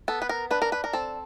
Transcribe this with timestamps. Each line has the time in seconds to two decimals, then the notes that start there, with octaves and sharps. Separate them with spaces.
0.08 B3 A4
0.22 B4
0.29 A#4
0.51 D4 B4
0.62 A#4
0.72 B4
0.84 A#4
0.93 C4 A4